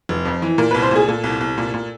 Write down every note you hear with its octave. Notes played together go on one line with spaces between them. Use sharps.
F1
F2
E3
A#2 A#4
C2 B4
C5
A#2 G#4
A#2 A4
C2
C2
A#2
A#2